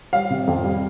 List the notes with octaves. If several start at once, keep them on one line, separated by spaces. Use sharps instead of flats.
G3 F5
C3
F2
G3